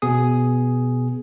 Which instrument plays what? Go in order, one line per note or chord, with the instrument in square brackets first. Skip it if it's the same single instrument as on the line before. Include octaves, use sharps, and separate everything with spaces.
[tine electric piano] B2 B3 G#4 D#6